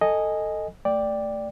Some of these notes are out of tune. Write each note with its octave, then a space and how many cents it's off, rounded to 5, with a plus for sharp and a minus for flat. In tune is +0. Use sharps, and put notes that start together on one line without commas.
A4 +10 D#5 +0 G#5 -10
A3 +15 D5 +0 G5 +5